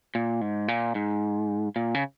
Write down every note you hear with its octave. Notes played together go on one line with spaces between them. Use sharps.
A#2
G#2
A#2
G#2
A#2
C#3